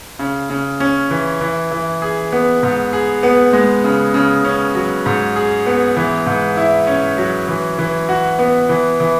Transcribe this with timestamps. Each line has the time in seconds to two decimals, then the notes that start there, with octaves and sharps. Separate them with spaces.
0.19 C#3
0.50 C#3
0.80 C#4
1.11 E3
1.41 E3
1.71 E3
2.02 G#4
2.32 B3
2.63 G#2
2.93 G#4
3.23 B3
3.53 G#3
3.84 C#3
4.14 C#3
4.44 C#4
4.75 F#3
5.06 G#2
5.36 G#4
5.66 B3
5.96 E3
6.26 G#2
6.57 E4
6.87 C#4
7.18 F#3
7.48 E3
7.79 E3
8.09 F#4
8.39 B3
8.69 E3
9.00 E3